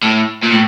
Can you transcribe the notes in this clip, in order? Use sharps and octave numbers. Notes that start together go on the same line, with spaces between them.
A2
A#2
A2